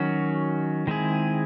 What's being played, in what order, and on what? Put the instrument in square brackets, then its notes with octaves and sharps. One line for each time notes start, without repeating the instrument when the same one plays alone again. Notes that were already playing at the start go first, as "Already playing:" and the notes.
Already playing: [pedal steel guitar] D#3 F#3 C#4 F#4
D#3 G#3 C4 E4 G#4